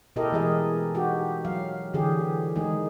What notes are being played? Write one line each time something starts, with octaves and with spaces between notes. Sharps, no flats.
B2 E4 G4 A4 A#4 D#5
E3 G#3 G#4 D#5
D#4 F#4 G4
F#3 F5
D3 E3 G4 G#4
D#3 G#3 D#4 G#4